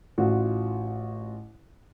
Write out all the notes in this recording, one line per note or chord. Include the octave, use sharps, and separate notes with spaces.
A1 F4 F#4